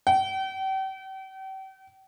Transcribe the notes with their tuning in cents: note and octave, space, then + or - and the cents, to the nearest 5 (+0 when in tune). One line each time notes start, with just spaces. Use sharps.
G5 -40